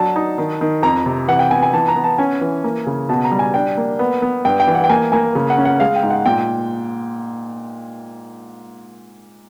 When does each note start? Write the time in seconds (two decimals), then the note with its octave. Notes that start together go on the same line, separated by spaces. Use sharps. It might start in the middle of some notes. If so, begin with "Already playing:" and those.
Already playing: F#3 D4 A5
0.16 D#4
0.38 D#3
0.61 D#3
0.83 F2 A#5
1.06 C3
1.28 E3 F#5
1.39 G5
1.51 B3 G#5
1.63 G#5
1.73 E3 A5
1.88 A#5
1.96 B3
2.04 A5
2.18 C#4 G#5
2.41 E3
2.64 A#3
2.86 C#3
3.09 B2 A5
3.25 A#5
3.31 G3
3.39 G#5
3.54 D4 G5
3.77 A#3
3.99 B3
4.22 B3
4.45 G2 G5
4.60 G5
4.67 E3
4.75 F#5
4.84 G5
4.89 A#3 G#5
5.12 A#3 G#5
5.35 C#3
5.50 F#5
5.58 C#4
5.65 F#5
5.80 G#3 F5
5.96 G5
6.03 G#2
6.10 F#5
6.26 A#2 G5